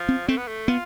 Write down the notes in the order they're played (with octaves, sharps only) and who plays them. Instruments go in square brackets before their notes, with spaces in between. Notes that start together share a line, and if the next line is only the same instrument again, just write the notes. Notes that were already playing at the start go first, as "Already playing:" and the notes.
Already playing: [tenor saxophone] F3
[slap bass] C4
[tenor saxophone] A3 [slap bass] C4
[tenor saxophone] B3
A3
[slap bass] B3 [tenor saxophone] F4